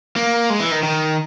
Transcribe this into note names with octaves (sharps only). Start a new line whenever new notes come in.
A#3
G#3
E3
D#3
D#3